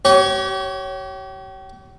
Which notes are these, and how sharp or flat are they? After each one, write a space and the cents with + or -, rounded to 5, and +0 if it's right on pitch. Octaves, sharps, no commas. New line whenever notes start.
G4 -40 C#5 +0